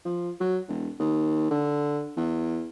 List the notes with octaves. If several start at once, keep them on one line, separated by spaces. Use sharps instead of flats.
F3
F#3
E1
D#2
D3
E2